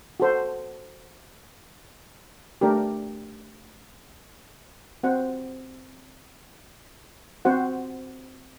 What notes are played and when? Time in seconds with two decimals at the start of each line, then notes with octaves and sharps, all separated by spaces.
0.20 F#4 A4 C5
2.61 A3 D4 G4 A#4
5.03 C4 F#4 C5 F#5
7.45 C4 F#4 C5 F#5